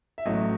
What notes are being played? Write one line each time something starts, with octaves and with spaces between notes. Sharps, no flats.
E5
A1 A2 F#3 D#5